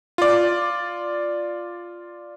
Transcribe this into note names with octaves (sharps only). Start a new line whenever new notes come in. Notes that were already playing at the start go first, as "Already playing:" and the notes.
F4 D5